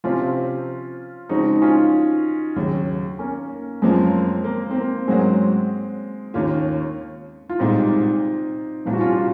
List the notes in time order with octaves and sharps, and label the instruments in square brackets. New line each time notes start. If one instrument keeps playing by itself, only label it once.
[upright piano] C3 F3 C4 [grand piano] C#4 F4
[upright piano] C#3 F3 G#3 C4 [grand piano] D#4 F#4
[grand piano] D#4
C#4 F4
[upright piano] D#2 C#3 F#3
[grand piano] A#3 C#4
[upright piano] F#2 F3 A#3 C#4 F4 [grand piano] G#3 C4
[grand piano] A#3
C4
A#3
[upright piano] G#2 F#3 C#4 F#4 [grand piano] G#3 C4
[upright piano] D#2 D#3 A#3 C#4 F4
[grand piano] F4
[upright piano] C2 A#2 G#3 [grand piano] C4 D#4
[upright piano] C2 A#2 F3 [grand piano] F4
[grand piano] F#4
C#4 F4